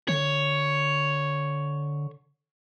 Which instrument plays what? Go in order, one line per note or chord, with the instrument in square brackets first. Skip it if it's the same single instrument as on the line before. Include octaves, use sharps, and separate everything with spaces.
[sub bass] D3 [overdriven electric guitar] C#5